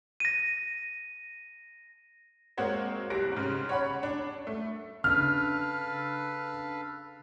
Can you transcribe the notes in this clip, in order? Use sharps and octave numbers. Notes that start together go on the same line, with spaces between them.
A#6 D#7
G#3 A#3 C4 F#4 C5 C#5
F#1 C2 G3 F#6 A#6 D7
G#2 C#3
C#5 F#5 B5
D4
A3
C#3 D4 A4 B4 F5 F6